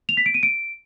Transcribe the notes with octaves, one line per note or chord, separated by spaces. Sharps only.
F7
B6
D7
D#7
D7